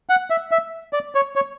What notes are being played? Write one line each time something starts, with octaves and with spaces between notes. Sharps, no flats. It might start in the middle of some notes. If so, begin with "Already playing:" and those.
F#5
E5
E5
D5
C#5
C#5